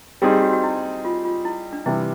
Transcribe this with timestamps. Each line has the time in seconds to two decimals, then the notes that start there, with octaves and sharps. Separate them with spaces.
0.22 G3 C4 D#4 G4 G#4
0.32 G4
0.43 F#4
0.53 F#4
0.64 E4
1.05 F4
1.25 F4
1.45 E4
1.73 D4
1.86 C3 E3 G3 E4